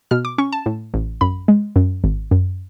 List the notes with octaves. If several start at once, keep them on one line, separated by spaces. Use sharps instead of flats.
B2 F6
D6
C#4 C#6
A5
A2
A1
F#2 B5
G#3
F#2
G#1
F#2